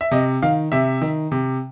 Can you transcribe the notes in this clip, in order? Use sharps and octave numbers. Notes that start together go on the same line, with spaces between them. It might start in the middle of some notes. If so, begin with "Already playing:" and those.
E5
C3 D#5
D#3 F5
C3 E5
D#3
C3